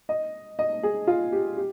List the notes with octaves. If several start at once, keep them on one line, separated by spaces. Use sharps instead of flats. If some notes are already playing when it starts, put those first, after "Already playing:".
D#5
D#5
G#4
F4
G4
G4